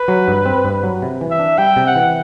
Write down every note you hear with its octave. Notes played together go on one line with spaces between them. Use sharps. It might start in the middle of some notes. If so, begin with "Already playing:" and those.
Already playing: B4
F#3
G2
C4
G2
F#3
C3
E3
E5
D4
G3 G5
C3
F#5
E3